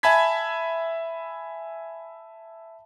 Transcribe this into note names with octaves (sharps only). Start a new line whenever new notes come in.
E5 G#5 A5 B5 G#6 B6